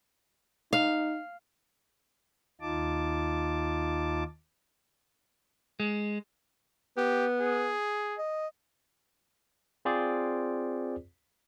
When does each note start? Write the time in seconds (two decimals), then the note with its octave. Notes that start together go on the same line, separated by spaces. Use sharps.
0.73 D#4 F5
2.61 D#2 D#4 F4 A5 D6
5.80 G#3
6.97 B3 G4
7.40 G#4
8.18 D#5
9.85 C4 F4 G#4 C5 D5